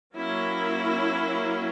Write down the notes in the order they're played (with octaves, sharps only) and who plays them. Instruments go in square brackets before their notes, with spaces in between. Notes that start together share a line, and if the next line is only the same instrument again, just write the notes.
[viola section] F#3 A#3 C#4 E4